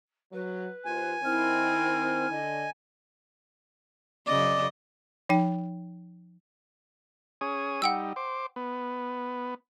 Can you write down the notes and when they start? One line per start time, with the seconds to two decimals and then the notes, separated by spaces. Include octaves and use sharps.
0.32 F#3 B4
0.85 D#2 F4 C5 G#5
1.23 D#3 C4 E4 F6
2.31 D3 D#5
4.27 F#2 C#3 D5 D#5
5.29 F3 D#4 G5
7.41 C#4 G#4 D#6
7.82 G3 D#4 F#5 G5 E6
8.16 C5 D6
8.56 B3